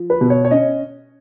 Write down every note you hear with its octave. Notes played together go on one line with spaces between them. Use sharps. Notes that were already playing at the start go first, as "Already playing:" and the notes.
Already playing: F3
B4
B2
C#5
C#5
C#4 D#5